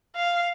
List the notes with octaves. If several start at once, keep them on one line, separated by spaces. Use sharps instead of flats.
F5